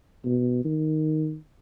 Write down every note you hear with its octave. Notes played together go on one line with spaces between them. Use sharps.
B2
D#3